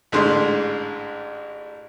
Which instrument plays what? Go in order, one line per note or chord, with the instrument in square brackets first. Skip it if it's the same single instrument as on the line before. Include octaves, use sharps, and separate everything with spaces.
[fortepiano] A1 G#2 D3 G#3 C6